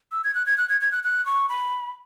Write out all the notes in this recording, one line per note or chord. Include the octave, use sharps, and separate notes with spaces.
E6
G#6
F#6
G#6
F#6
G#6
G#6
F#6
F#6
C#6
B5